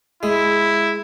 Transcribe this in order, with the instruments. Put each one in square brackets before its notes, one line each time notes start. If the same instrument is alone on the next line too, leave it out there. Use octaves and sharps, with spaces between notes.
[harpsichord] G#3 [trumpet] E4